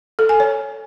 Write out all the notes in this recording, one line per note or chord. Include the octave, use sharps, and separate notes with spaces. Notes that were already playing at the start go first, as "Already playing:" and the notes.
A4
G#5
C#5